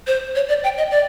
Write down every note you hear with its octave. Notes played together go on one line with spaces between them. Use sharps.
C5
C#5
D5
G5
D#5
D5